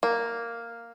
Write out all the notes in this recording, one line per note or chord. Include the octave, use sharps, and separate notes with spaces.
A#3